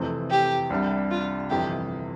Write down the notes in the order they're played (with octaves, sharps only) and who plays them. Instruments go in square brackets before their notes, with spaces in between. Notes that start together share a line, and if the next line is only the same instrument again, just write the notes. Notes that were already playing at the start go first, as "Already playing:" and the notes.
Already playing: [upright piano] F2 C3 E3 A3 C4
[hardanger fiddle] G4
[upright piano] C2 C3 G3 D4
[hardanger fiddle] F4
[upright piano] G1 F2 C3 E3 [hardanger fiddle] G4